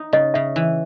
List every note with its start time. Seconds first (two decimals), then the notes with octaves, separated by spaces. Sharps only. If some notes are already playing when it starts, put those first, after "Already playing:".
Already playing: D#4
0.13 C#3 D#5
0.34 C#3 E5
0.56 E3